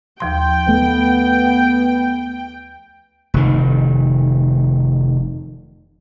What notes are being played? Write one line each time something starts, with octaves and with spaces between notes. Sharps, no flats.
D#2 F3 G5 C6
A3 B3
F1 D#3